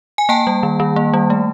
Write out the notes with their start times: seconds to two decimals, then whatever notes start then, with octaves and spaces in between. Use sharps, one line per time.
0.18 G#5
0.29 A#3 G5 A5
0.47 G3
0.63 D#3
0.80 D#3
0.96 A#3
1.13 G3
1.30 A3